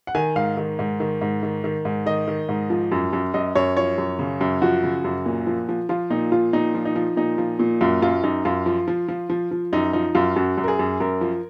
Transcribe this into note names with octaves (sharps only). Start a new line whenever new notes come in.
F#5
D#3 G#5
G#2 F5
D#3
G#2
D#3
G#2
D#3
D#3
G#2
D#3 D#5
D#3
G#2
F3
F#2
F#2
F#2 D#5
F#2 C#5
F3 C#5
F#2
C#3
F#2
F3 F#4
C#3
F#2
A#2
F3
F3
F3 F4
A#2 D#4
F3 F4
A#2 D#4
F3
D#4
F3
A#2 D#4
F3
A#2
F#2 F4
F#2 F4
F#2 D#4
F#2 F4
F3
F3
F3
F3
F3
F#2 D#4
F3 D#4
F#2 F4
F#2 F#4
F#2
A#4
G#4
F#2
F#2 A#4
F3